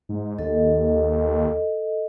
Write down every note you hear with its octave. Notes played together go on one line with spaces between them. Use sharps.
G#2
D#2 A4 D#5